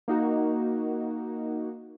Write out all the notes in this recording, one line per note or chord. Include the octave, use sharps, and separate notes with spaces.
A#3 D#4 F#4